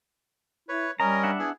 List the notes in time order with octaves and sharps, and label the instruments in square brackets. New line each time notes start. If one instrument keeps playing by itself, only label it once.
[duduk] E4 [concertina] B4 C#5
[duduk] G3 [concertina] C#4 A#4 D#5 [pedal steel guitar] A#5
[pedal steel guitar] D4 E5 F#5
[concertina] B3 E4 G#4